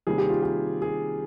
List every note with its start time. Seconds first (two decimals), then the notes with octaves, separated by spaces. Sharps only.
0.07 C3 D#3 G3 A#3 G#4
0.18 G4
0.30 F4
0.42 G4
0.82 G#4